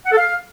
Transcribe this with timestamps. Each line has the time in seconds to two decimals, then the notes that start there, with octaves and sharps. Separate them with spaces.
0.06 F#5
0.12 A4
0.17 F5